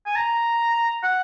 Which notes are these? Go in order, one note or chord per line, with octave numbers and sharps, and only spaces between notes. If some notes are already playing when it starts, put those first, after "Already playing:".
G#5
A#5
F#5